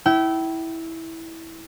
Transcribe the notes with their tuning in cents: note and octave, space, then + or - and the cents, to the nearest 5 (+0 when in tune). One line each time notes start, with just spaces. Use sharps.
E4 -10 G5 -30